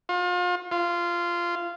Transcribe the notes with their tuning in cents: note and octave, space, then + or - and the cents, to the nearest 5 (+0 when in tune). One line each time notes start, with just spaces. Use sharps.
F4 +35
F4 -15